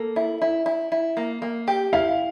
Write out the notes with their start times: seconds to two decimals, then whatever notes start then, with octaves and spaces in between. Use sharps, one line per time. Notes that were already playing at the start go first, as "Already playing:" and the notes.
Already playing: A#3 A4
0.16 E4
0.42 E4
0.66 E4
0.92 E4
1.17 A#3
1.42 A#3
1.68 G4
1.93 E4 F5